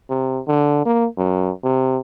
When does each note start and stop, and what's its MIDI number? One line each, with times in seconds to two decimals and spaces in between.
0.10 0.41 48
0.48 0.85 50
0.86 1.06 58
1.18 1.51 42
1.64 1.99 48